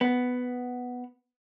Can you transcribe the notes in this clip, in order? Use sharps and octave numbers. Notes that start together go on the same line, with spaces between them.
B3